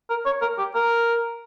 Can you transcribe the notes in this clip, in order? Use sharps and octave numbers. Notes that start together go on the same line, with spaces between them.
A#4
C#5
A#4
G4
A#4